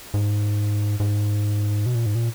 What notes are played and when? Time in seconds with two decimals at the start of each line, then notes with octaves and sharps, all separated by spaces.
0.14 G#2
1.00 G#2
1.86 B2
1.95 A#2
2.06 G#2
2.15 A#2